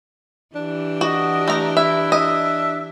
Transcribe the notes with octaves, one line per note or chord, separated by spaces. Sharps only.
E3 D4 G4
F#4 D#5
A3 A#5
D4 E4 E5
D#5 E5